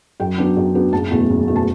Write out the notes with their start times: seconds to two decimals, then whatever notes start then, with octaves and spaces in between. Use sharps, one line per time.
0.20 F#2 G5
0.38 F#3 B3 D4
0.57 F#2
0.75 F#3 B3 D4
0.93 F#1 A5
1.11 E2 B2 A3
1.29 F#1
1.48 B2 A3
1.56 A5